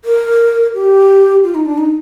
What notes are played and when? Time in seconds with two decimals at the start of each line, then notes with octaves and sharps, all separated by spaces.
0.05 A#4
0.74 G4
1.44 F4
1.55 D#4
1.66 D4
1.78 D#4